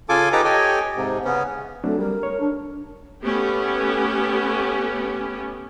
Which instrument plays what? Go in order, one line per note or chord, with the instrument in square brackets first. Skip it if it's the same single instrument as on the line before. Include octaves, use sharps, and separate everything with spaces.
[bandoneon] C#3 F4 A4 G#5 D6
D#4 G4 A4 B4 A#5 D6
G4 A4 C#5 D#5 G5 G#5
G#2 C3
C#3 B3 C#4
[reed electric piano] F#3 C4 D4 [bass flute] A3
[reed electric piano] G3 [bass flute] A#4
[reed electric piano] C#5
[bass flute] D4
[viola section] A3 B3 C#4 G4